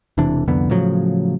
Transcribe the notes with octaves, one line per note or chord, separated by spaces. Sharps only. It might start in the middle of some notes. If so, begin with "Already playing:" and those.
E1 C3 E3 D4
C2 F2 D3 B3
A2 C#3 F3 F#3